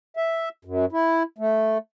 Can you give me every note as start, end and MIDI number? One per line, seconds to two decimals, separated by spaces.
0.17 0.49 76
0.65 0.85 42
0.92 1.23 64
1.38 1.78 57